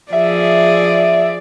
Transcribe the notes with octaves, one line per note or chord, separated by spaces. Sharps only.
F3 G#4 D5 E5